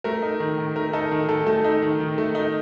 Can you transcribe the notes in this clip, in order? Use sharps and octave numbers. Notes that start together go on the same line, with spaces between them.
A3 A#4
D#4
D#3
D#3
A3 A#4
D#4 A4
D#3
D#3 A4
A3 A4
D#4
D#3
D#3
A3
D#4